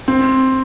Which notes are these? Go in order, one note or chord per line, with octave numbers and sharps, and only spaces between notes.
C4